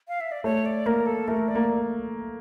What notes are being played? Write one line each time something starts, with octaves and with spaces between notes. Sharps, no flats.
F5
E5
D5
A3 C#5
D5
A#3 A#4
A4
A3 A#4
D5
A#3